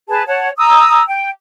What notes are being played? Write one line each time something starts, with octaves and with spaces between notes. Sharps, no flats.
G#4 B4 A5
C#5 F#5 A5
A#5 D#6 E6
G5